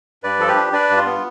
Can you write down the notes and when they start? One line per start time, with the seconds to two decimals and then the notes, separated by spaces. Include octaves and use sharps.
0.24 G2 B4 D5
0.39 F3 A4
0.48 G4 B4
0.56 D4
0.73 D4 B4 D5
0.90 G2
0.97 F4
1.06 B3